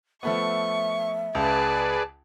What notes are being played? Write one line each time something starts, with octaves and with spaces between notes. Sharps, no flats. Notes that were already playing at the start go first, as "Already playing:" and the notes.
F3 A3 B3 E5 C#6
C#2 G#4 B4 D5 A5